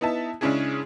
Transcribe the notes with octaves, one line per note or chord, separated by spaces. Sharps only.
B3 D#4 E4 E5 A5
C#3 G#3 C#4 D4 E4 G#4